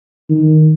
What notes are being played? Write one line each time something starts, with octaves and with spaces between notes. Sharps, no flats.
D#3